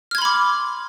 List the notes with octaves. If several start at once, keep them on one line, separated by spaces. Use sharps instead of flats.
B5 C6 D6 F6 G#6